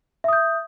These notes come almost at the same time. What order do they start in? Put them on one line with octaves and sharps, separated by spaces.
E5 D#6 G6